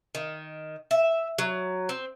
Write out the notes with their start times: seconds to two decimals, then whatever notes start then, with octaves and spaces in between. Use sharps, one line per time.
0.15 D#3
0.91 E5
1.38 F#3
1.89 C4